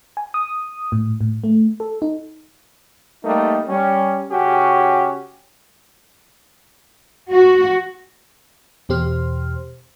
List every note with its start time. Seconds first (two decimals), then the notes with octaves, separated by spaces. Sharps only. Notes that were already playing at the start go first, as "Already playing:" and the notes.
0.17 G#5
0.34 D#6
0.92 A2
1.21 A2
1.44 A3
1.80 A4
2.02 D#4
3.24 G3 A3 A#3 D#4
3.67 G3 C#4
4.30 C#3 C#4 F#4 G4
7.30 F#4
8.89 E2 B2 G4 C5 C6 F6